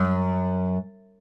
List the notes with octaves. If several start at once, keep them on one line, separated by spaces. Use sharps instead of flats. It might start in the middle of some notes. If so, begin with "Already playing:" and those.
Already playing: F#2